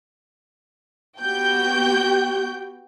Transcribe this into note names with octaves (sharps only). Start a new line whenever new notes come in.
B3 F#4 G4 G5 G6